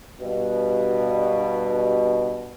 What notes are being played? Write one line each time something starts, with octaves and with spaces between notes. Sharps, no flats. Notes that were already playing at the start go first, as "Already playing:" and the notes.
G2 B2